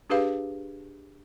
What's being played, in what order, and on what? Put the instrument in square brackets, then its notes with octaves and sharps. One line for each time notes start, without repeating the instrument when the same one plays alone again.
[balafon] D4 G4 G#4 B4 F5